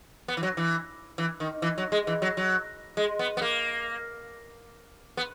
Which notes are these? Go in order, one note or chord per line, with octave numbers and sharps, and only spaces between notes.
B3
E3
F#3
E3
E3
D#3
E3
F#3
G#3
E3
F#3
F#3
G#3
B3
B3
A#3
B3